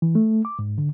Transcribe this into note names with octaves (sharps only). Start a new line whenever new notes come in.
E3
A3
D6
G#2
D3